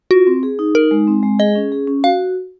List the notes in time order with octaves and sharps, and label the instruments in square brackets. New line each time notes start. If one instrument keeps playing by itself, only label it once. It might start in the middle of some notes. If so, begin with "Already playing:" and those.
[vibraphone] F4 [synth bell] F#4
[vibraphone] C4
G#4
D#4
[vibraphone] D#4 [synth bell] A#4
[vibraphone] G#3
C4
G#3
[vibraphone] G#4 [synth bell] D#5
[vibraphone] C#4
G#4
C#4
[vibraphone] F#4 [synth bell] F5